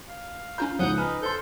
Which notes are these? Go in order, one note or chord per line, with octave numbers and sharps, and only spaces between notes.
F5
C#4 F4 A#5 G6
C#2 F3 D#4 F#5 D#6 G6
D#4 B4 G#5 F6
A4 C5 C6 G6